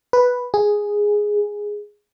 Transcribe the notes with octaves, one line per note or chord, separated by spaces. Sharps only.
B4
G#4